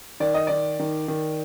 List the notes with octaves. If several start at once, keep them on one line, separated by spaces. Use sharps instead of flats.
D#3 D5
D#5
D#3 D5
D#3
D#3